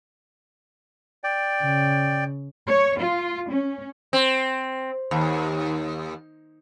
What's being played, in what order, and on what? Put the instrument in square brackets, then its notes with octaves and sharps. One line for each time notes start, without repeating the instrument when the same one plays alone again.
[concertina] D5 G5
[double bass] C#3
[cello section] C#5
F4
C#4
[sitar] C4
D#2